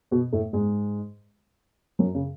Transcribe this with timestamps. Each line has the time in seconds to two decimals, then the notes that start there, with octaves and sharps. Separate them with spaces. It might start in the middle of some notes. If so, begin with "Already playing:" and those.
0.11 B2 B3
0.33 A2 A3
0.53 G#2 G#3
1.99 F#2 F#3
2.15 C#3